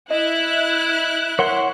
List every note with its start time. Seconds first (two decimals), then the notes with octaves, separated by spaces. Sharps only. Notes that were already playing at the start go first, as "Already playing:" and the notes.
0.10 E4 D#5 F#6
1.39 A#4 C#5 F#5 C6